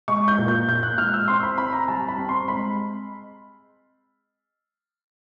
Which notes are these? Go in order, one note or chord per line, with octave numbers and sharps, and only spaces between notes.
G#3 C#6
G6
A#2
G6
A#2 G6
F#6
G#3 F6
E6
C4 C6
B5
C4 B5
A#5
G3 A5
B5
C4
C6
G#3 B5